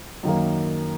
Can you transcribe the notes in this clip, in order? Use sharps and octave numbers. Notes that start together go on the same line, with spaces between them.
F#2 D#3 A#3